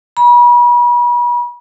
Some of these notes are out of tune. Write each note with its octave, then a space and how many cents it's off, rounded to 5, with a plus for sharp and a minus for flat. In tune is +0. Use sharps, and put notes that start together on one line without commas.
B5 -40